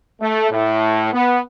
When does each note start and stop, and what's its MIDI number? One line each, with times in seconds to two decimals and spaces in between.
0.21 0.47 57
0.51 1.13 45
1.13 1.39 59